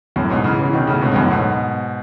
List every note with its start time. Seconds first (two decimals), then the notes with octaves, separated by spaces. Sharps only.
0.16 F#2 A2
0.30 G#2 B2
0.44 C#3 E3
0.59 C#3 E3
0.73 B2 D#3
0.87 A2 C#3
1.02 G#2 B2
1.12 G#2
1.16 F#2 A2
1.30 G#2 B2